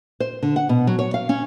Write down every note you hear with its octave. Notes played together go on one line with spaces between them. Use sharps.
C5
D3
F#5
B2
F#3
C#5
F5
C#4